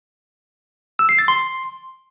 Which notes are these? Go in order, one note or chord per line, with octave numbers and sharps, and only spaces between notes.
E6
C7
A6
C6